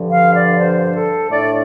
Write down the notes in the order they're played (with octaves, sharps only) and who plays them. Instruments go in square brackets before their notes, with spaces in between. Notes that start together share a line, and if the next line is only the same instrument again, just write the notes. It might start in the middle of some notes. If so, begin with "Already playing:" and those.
Already playing: [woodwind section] G2 D3 F3
F5
D5
C5
A4
A2 A3 D4 D5